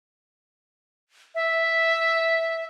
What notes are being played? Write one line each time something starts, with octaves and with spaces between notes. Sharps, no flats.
E5